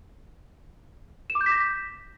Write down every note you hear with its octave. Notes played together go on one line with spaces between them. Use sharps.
E7
D6
G6
B6
A#6